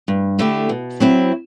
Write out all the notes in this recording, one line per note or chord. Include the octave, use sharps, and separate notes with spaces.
G2
D3 A3 E4 G4
B2
F#3 C4 E4